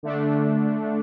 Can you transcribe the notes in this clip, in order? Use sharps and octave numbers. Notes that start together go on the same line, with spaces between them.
D3 A3 D4